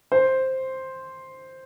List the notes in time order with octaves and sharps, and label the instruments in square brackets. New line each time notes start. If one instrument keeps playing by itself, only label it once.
[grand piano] C5